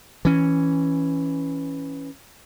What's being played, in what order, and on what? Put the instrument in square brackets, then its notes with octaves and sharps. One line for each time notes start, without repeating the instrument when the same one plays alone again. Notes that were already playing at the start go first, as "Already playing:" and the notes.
[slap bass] E3 C#4